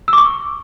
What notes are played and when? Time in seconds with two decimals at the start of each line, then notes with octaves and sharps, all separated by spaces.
0.08 E6
0.13 D6
0.18 C#6